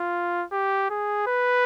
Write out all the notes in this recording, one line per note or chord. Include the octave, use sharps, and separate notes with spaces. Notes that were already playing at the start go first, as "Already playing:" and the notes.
Already playing: F4
G4
G#4
B4